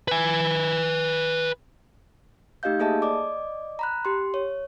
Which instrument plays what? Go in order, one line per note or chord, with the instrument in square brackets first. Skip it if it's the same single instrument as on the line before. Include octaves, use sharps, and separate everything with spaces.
[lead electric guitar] B4 G#5
[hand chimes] A3 D#4 G4 D#5 F5 G6
A#3 G#4 A4 D#5 E5 A5
D5 D#5 D6
A#5 B5 F#6
G4 C6
C#5